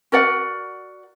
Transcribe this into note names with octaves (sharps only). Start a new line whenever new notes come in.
F#4 A#4 D5 F#5